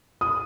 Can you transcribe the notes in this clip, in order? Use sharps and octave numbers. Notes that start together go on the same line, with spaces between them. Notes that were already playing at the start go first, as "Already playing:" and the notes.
D#6